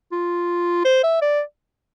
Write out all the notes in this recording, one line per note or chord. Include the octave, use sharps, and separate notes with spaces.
F4
C5
E5
D5